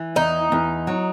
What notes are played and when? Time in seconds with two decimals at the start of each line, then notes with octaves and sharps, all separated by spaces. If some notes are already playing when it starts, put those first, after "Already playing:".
Already playing: E3
0.16 E2 D#4
0.52 E2
0.87 F#3